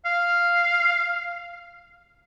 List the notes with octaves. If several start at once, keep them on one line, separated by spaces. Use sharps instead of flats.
F5